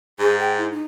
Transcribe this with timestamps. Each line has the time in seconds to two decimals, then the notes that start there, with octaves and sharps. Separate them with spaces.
0.19 G#2 G#4
0.39 G5
0.57 E4
0.71 D#4